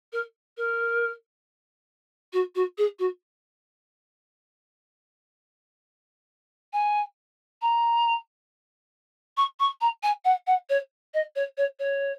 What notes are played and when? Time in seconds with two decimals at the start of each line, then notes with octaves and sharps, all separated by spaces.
0.13 A#4
0.57 A#4
2.33 F#4
2.55 F#4
2.78 G#4
2.99 F#4
6.73 G#5
7.62 A#5
9.37 C#6
9.60 C#6
9.81 A#5
10.03 G#5
10.25 F#5
10.47 F#5
10.70 C#5
11.14 D#5
11.36 C#5
11.58 C#5
11.79 C#5